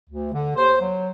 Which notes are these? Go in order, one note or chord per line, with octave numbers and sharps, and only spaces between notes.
D2
D3
D#2 C5
F#3